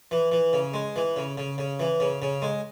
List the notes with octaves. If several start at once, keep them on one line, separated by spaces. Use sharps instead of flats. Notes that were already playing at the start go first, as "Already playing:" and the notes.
E3
E3
C#3
G#3
E3
C#3
C#3
C#3
E3
C#3
C#3
G#3